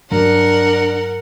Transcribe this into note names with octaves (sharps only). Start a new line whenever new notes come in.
G2 F#3 D4 A#4 F#5